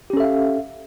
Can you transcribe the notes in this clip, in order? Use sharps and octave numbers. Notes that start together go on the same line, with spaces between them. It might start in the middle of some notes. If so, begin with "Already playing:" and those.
C#4 G4 A4 E5 F5